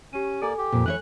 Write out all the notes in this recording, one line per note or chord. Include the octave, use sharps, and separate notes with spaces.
C#4 G4 D#7
A#3 A4 D5 G#5
G4
F2 A#2
E3 E4 C#5 F#6